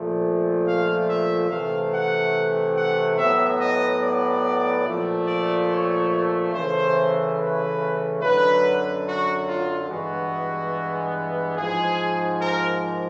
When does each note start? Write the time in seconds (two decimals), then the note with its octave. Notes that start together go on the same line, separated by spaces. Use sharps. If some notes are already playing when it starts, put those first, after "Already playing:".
Already playing: A#2 F3 A3
0.66 F5
1.08 E5
1.49 C3 E3 A3 F5
1.92 F#5
2.76 F#5
3.17 A2 F#3 B3 E5
3.59 D#5
4.02 D5
4.84 A#2 F3 A3
5.27 D5
5.69 C#5
6.53 C#3 E3 A3 C5
7.37 B4
8.20 F#2 D3 F#3 B4
9.05 F#4
9.47 F4
9.88 G2 E3 G#3 B3 F#4
11.56 G#2 F3 G#3 G#4
12.40 A#4